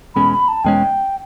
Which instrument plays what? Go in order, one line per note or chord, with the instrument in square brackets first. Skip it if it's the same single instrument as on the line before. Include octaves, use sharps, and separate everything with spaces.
[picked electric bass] E2 B2 G#3 C#4 [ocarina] B5
[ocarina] B5
A5
[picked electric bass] E2 B2 G#3 C#4 [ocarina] G5